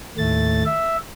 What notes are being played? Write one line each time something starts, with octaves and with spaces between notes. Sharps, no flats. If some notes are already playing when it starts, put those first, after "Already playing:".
D#2 A2 A3 A6
E5